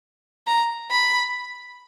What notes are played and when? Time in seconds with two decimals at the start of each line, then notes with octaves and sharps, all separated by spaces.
0.47 A#5
0.91 B5